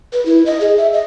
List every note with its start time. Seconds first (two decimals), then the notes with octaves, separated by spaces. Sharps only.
0.13 B4
0.26 E4
0.46 D#5
0.61 G#4
0.78 E5
0.93 D#5